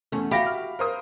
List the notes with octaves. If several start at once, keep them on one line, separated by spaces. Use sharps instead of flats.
E2 A3 C#4
F#4 G4 E5 F5 B5 A#6
F6
A#4 C5 D#6